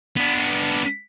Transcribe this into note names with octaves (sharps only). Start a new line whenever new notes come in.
B3 D4